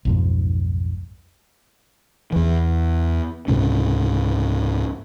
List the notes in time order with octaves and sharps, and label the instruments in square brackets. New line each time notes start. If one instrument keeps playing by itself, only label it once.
[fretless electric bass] B1 F2 G#2
[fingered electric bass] E2 E3
C#2 G#2 C3 C#4